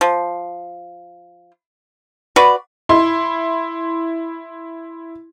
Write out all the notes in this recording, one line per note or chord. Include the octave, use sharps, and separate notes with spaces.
F3
F#4 B4 D5
E4 C6